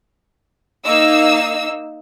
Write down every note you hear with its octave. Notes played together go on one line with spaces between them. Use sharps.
A#3 D#4 E6